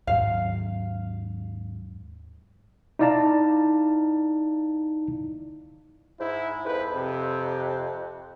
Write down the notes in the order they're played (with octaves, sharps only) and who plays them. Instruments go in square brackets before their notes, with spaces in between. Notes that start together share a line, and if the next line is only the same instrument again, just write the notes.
[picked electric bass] D#2 G#2 F#3 [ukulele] F5
[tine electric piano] D#4 E4 D5 F5 A5 A#5
[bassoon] G#2 [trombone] E4
[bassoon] F2 [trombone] B4
[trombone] C3